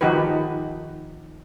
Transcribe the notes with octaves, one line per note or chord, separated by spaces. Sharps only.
D#3 F3 D#4 F#4 G4 B4